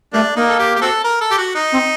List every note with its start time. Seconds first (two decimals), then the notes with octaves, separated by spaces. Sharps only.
0.13 G3 A3 A#3 D4
0.36 A#3 D#4
0.49 A4
0.59 G4
0.76 G4
0.82 C4 F#4 A4
1.04 A#4
1.21 A4
1.31 G4
1.38 F#4
1.55 D#4
1.72 C4